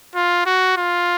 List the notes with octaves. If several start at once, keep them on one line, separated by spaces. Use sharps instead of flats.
F4
F#4
F4